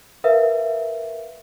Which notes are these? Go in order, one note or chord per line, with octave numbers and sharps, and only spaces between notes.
A#4 B4 E5 F5